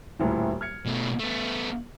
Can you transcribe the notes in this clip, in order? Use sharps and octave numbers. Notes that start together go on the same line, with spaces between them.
D#1 D2 A2
F6 G#6 C#7
B2 A3
A3 B3